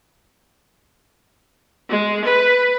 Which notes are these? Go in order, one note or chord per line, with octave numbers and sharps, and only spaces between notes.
G#3
B4